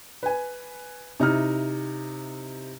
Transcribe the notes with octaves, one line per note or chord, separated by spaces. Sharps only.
B4 G#5
C3 D#4 E4 F6